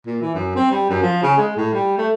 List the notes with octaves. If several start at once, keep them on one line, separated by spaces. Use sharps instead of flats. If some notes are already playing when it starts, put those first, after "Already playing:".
A#2
E3
F#2
C4
G3
F#2
F3
C#3
G#3
A2
G3
A3